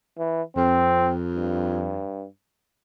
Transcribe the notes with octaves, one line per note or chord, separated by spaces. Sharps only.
E3
F2 C4
G2